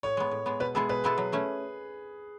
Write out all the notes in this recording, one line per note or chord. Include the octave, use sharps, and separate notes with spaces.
A2 C#5
G#3 B3
A2
G#3 B3
B2 B4
G#3 B3 E4 G#4 A4
B2 B4
G#3 B3 E4 A4
F#3
A3 C#4 E4